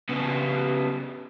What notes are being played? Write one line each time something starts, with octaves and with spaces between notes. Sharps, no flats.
C#3 B3